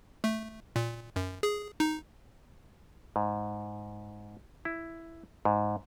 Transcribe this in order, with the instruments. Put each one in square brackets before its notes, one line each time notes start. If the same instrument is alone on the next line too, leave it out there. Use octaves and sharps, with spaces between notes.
[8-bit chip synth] A3
A#2
F#2
G#4
D#4
[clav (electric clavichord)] G#2
E4
G#2